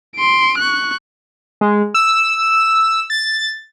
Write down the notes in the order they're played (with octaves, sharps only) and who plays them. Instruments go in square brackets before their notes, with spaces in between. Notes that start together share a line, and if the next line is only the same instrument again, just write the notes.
[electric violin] C6 D7
C#6 F#6
[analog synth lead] G#3
E6
A6